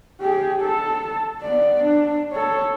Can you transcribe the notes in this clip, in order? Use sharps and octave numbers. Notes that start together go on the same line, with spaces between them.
G4 G#4
A4 A5
B3 D5
D4
A4 C#5